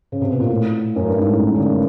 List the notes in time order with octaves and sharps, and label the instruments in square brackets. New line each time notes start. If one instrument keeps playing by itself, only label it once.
[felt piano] C#3
C3
B2
A#2
A2
F#2
G2
G#2
A2
D3